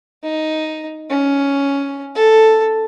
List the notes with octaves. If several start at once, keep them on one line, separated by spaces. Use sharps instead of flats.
D#4
C#4
A4